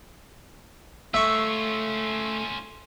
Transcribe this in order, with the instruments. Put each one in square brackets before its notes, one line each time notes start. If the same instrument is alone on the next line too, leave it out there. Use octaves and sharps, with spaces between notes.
[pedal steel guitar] A3 [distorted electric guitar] C#4 F4 [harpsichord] E5 C#6